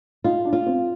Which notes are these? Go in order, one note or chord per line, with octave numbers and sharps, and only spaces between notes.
D#4 F4
D4
F4
C4